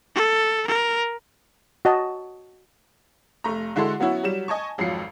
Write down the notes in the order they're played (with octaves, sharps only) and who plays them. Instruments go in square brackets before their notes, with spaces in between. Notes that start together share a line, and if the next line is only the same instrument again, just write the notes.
[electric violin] A4
A#4
[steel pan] F#4 D#5 A5
[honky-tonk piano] F1 A3 A#5
D3 G#3 E4 F#4 A4 C6
F#3 B3 C#4 E4 F#4
F#3 G3 E7
D#5 G#5 A5 C#6
G#1 F2 F#3 F4 C7 C#7